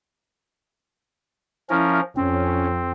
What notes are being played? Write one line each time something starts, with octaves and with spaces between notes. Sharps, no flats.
F3 C#4 E4 A#4
F2 C4 C#4